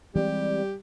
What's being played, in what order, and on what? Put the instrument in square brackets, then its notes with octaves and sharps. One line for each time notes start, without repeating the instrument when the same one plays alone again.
[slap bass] E3 G#3 C4 [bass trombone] G3 [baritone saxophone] G4 [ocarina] D5